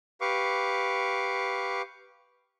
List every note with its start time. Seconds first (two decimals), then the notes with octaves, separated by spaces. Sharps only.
0.21 G4 B4 F5 C#6 D6